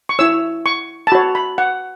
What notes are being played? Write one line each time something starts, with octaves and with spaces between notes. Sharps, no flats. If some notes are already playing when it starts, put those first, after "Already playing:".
C#6
E4 C#5 E6
C#6
A5
F#4 C#5 B5
B5
F#5